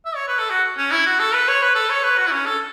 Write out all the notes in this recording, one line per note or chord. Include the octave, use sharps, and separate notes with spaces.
E5
C#5
B4
A4
F#4
C#4
E4
F#4
A4
B4
C#5
B4
A4
C#5
B4
F#4
E4
C#4
A4